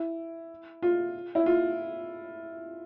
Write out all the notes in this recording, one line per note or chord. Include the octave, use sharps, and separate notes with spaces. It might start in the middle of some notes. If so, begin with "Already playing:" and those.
Already playing: E4
F4
E4
F4